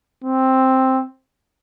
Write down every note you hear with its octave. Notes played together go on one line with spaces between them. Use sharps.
C4